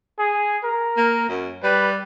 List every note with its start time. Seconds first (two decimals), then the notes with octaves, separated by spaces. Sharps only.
0.19 G#4
0.64 A#4
0.97 A#3
1.28 F#2
1.64 G3 B4